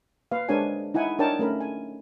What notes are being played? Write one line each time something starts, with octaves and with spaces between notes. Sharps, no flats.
A#3 B4 F5
G#3 D4 A#4 C5 C#5 G#5
D#4 E4 F#5 G#5
D4 D#4 A#4 C#5 G5 A5
A3 C#4 A#4 B5
G#5